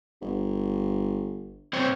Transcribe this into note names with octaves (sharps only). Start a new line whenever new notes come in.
G1
C4 C5 C#5